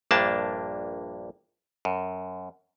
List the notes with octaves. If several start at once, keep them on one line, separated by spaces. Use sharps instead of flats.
A#1 G2 A#3 D4 A5
F#2